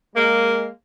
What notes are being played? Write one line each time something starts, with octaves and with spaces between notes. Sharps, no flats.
G#3 A#3